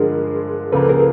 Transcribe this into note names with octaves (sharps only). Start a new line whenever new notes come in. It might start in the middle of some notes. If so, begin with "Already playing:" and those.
Already playing: G2 D3 F3 G#3 G#4 A#4
C#2 C#3 F3 A#3 A4 B4
G#4 A#4